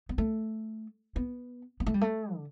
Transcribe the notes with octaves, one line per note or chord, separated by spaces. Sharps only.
B3
A3
B3
B3
A3
G3
A3
D3